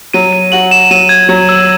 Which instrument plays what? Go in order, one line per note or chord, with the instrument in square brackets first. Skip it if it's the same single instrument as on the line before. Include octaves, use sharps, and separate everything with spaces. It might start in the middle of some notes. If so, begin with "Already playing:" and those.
[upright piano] F#3 [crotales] D#7
[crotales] D#7
[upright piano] F#4 [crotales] F#7
[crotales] E7
[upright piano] F#3 [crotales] D#7
[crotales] G#6
[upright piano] F#3
[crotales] E6